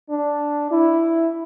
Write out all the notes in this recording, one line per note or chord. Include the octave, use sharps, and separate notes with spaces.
D4
E4